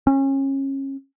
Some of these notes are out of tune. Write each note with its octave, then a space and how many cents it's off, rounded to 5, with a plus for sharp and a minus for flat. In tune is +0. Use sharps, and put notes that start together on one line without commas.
C#4 -30